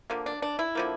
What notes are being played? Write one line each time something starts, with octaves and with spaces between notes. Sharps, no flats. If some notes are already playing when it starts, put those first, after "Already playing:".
D3 F3 A#3
D4
D4
E4
D3 F3 A#3